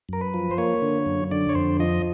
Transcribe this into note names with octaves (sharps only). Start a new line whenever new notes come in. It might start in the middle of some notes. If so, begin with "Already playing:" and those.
F#2 A#4
B4
F3
C5
A#3 C#5
D3
F#2
D3 D5
C#5
F2 C5
F3 D#5